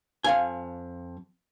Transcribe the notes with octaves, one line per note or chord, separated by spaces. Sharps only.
F2 F5 G#5